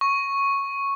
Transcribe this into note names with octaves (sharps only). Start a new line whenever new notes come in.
C#6